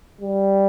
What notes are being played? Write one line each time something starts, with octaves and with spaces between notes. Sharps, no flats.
G3